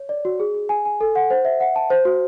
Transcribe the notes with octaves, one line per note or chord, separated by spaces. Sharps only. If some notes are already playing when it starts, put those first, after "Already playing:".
Already playing: C#5
D5
F#4
G#4
G#4
G#5
G#5
A4
F#5
C5
E5
F#5
A5
C5
F#4